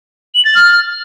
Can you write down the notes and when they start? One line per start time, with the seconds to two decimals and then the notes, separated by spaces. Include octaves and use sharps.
0.35 F#7
0.45 A6
0.55 F6